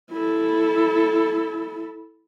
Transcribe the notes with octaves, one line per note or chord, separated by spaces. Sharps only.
E4 A4